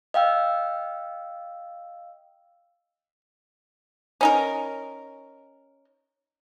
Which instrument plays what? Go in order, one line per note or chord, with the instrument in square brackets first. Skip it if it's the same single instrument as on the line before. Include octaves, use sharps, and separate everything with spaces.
[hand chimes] D#5 F5 G5 E6
[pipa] C#4 D#4 A#4